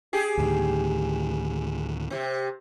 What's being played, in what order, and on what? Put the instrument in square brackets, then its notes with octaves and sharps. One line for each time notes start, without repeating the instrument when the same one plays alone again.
[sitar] G4 G#4
[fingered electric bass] D2 A2 D#3
[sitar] C3 C4